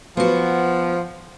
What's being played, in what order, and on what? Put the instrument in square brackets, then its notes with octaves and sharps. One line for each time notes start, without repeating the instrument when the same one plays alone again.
[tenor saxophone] F3 [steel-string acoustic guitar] B3 F#4